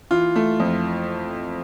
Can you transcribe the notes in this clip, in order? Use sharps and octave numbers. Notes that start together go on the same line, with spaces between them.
E3 F4
A3
F2